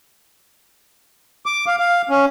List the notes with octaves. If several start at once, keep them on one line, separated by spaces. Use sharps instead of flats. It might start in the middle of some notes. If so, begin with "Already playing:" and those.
D6
F5
F5
C#4